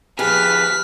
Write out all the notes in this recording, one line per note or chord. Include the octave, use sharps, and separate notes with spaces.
F2 G4 G#4 B4 F5 F6 B6